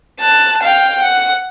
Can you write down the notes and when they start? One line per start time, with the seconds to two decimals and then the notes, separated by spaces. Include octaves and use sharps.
0.20 A5 F#6
0.62 F5 G5
1.02 F#5